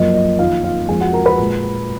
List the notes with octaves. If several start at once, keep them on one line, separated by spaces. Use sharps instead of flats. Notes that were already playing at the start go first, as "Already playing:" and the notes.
Already playing: F#2 F3 A#3 D#5
D#5
F2 D#3 A#3 F4 F5
F4 F5
F2 F3 G#3 G#4 G#5
F#4 F#5
A#4 A#5
B4 B5
A#2 G#3